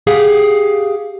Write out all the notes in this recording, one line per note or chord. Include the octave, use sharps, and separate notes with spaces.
G4 G#4 F5 F#5